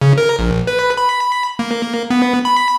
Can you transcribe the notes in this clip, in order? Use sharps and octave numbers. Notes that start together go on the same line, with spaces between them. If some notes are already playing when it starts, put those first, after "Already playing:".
C#3
A#4
A#1
B4
B5
A#3
B3
B5